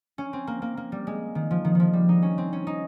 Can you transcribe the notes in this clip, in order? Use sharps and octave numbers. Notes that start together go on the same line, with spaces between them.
C#4
C4
A#3
A#3
A#3
G3
G#3
D#3
F3
D#3
D#3 F3
G3
D#4
C#4
C4
C#4
D#4